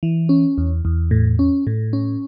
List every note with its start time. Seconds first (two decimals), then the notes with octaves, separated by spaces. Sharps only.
0.03 E3
0.29 C#4
0.58 E2
0.85 E2
1.11 A2
1.39 C#4
1.67 A2
1.93 C#4